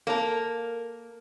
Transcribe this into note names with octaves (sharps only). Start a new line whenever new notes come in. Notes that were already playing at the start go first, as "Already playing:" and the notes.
A#3 A4 A#4 C#5 A5